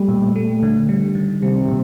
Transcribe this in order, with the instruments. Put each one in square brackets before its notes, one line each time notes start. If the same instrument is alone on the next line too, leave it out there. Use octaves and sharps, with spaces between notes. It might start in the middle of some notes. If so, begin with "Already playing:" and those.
Already playing: [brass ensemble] G3 [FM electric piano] A3
[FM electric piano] A#2
A3
D3
G3
D#3
[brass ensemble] C3 [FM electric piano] G3
[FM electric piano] A#2